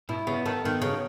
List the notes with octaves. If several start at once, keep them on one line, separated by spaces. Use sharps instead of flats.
B2 E4
C#3 B3
D#3 A4
D#3 B3
C#3 F#3